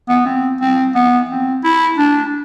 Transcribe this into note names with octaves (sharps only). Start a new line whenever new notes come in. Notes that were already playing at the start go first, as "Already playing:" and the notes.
B3
C4
C4
B3
C4
E4
D4